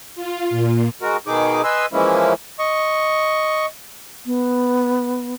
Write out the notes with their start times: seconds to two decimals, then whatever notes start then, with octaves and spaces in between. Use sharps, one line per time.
0.15 F4
0.50 A#2
1.02 G#3 F#4 A#4
1.27 B2 D#3 D#4 G#4 D6
1.64 B4 D#5 G#5 C6 E6
1.93 E3 F3 G#3 A#3 C#4 E4
2.59 D#5 C#6
4.26 B3